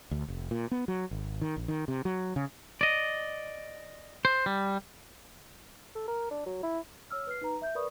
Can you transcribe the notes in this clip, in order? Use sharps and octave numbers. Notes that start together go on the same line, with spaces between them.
D2
F1
A#2
B3
F#3
G#1
D#3
A#1
D#3
C3
F#3
C#3
D5 D#5
C5
G3
A4
A#4
D4
F#3
E4
C#5 E6 F6
B4 F6 C7
D#4 B4 A#5
E5 G6
A#4 B4 D5 B5 C#6 D#6